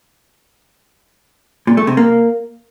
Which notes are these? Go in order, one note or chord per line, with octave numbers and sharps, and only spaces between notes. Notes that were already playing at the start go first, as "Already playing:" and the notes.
A#2
A3
C3
A#3